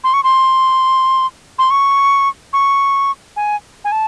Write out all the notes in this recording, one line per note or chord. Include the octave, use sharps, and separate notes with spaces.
C6
C#6
C6
C6
C#6
C#6
G#5
G#5
A5